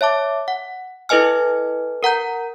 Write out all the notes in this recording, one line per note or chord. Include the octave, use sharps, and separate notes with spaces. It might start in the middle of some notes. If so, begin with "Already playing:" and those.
C#5 E5 A5 D6
F#5
E4 A4 B4 D#5 G#5 F6
A#4 F#5 A#5 G6